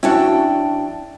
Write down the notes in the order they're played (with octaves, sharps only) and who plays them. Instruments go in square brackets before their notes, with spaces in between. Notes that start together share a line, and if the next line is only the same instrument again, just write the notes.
[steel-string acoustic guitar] F2 D4 G5 [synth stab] C#4 F#4 [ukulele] E4 A5